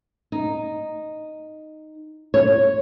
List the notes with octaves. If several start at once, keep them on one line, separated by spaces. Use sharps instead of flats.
D#4
C#5